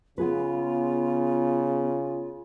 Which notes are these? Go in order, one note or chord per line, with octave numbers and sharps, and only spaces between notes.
C#3 B3 F4 G#4 B4